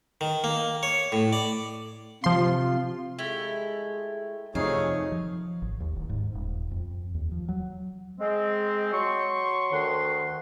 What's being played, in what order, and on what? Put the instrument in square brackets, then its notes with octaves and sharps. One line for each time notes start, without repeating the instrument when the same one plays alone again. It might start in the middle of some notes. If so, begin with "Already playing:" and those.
[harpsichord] D#3
A#3
C#5
A2
D5
[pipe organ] C3 F4 [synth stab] F3 C6
[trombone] G#3 [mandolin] A3 E4 G4
[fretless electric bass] F2 C3 F3 [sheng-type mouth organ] A3 G#4 C#5 [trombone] D#4 [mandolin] F5
[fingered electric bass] F3
G#1
D#2
D1
G#2
D#1
F2
D#2
F3
F#3
[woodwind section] G#3 C4
F#3 C6 C#6
D2 D#3 F#5 C6